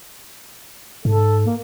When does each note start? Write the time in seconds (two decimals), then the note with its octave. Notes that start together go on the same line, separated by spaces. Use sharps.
1.05 G#2 A4
1.46 A#3